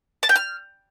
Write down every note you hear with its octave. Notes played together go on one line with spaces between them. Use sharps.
A5
G5
F6